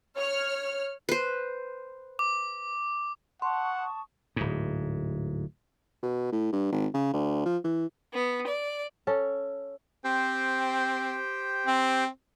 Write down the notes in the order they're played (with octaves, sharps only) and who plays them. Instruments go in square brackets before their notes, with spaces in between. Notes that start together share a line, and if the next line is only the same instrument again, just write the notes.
[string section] C#5 F6
[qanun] B4 C5
[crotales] D6
[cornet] F#5 [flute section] A5 C#6 D#6 [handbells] C6
[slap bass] D1 G#2
[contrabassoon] B2
A2
G2
G#1
C#3
D2
F3
E3
[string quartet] B3
D5
[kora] C#4 A4
[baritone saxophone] C4 [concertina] G4 C5 G5
[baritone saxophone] C4